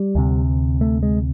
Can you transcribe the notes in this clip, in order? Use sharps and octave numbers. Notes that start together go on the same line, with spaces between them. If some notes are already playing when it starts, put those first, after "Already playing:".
Already playing: G3
D2 C3
A3
G#3